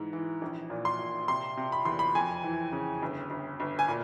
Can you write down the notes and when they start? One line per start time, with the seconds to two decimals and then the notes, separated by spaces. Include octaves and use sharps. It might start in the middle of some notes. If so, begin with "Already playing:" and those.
Already playing: G#2 E3
0.13 E3
0.42 A#1
0.70 A#2
0.85 C6
0.99 A#2
1.28 C3 C6
1.57 C3
1.72 B5
1.85 E2 C6
1.99 B5
2.15 F2 G#5
2.43 E3
2.72 C#3
3.02 G1
3.30 G1
3.60 G1
3.79 G#5
3.88 A#2